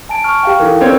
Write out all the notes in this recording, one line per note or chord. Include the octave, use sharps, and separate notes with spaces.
G#5 A5 D7
C#6 F6
G4 F5 G5
E3 D#4 A4 A#4
C4 C#4 B4 C#5 D5